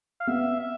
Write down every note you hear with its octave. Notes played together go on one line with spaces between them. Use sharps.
F5
B3 E5
E5